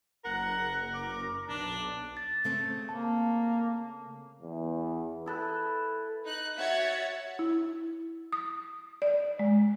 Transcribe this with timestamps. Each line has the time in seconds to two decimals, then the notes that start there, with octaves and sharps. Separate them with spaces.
0.25 F#1 A#4 F#5
0.94 D6
1.49 B1 D4
2.17 A6
2.44 C#3 A3 C4
2.89 A#3 A5
4.42 E2
5.26 E4 A4 B4
6.24 D#4 F#6
6.57 F#4 C#5 E5 F#5 G#6 A6
7.39 E4
8.33 D#6
9.02 D5
9.39 G#3